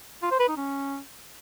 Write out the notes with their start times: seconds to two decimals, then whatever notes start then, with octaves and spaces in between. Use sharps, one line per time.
0.22 F4
0.31 C5
0.40 B4
0.48 D#4
0.57 C#4